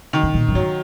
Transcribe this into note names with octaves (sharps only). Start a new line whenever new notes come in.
D#3
C#3
A#2
F#2
G#2 F#3